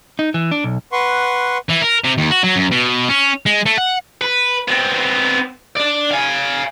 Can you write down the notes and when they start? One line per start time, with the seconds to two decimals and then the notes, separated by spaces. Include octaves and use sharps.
0.19 D#4
0.34 E3
0.51 D4
0.64 B1
0.92 B4 F#5 C6 C#6
1.69 E3
1.82 A#4
2.04 C3
2.18 D#2
2.31 F#4
2.43 F#3
2.56 F#2
2.71 B2
3.09 C#4
3.46 G#3
3.66 A3
3.78 F#5
4.21 B4
4.68 B3 C4
5.76 D4 D5
6.11 F5 G#5